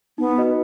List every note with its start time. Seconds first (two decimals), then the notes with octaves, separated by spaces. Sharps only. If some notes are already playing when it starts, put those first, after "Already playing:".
0.18 B3 D#4
0.38 F#4 B4 D#5